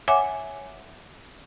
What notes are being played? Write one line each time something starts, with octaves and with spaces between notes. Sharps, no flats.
C#5 E5 F#5 G#5 D6